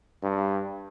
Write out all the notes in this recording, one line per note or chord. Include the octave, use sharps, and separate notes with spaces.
G2